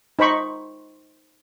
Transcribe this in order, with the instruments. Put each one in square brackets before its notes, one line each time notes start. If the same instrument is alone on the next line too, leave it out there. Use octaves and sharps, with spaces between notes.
[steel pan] D#4 C5 B5 C#6